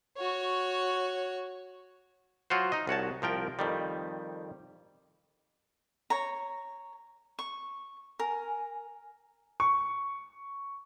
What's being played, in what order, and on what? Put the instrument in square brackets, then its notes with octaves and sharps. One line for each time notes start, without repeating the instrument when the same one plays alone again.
[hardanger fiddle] F#4 C#5
[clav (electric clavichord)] F#3 F4 F#4 C5
D#4 D#5
C2 F#4 C#5 A5
C2 F3 A#4 G5
F2 D#3 G3
[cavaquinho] C#5 A#5
C#6
[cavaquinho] A#4 [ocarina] G#5
[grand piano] C#6